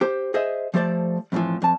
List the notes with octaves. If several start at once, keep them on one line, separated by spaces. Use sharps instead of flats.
G4 C5
G#4 C5 D#5 E5
F3 A3 G4 C5 D5
F2 A2 C#3 E3 F3
F2 A5